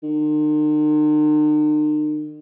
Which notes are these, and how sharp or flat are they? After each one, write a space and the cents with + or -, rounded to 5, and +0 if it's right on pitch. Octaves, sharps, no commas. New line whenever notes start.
D#3 -45